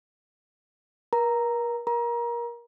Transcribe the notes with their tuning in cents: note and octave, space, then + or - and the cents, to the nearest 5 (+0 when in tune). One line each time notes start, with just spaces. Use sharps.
A#4 +35 A#5 +0
A#4 +20 A#5 +25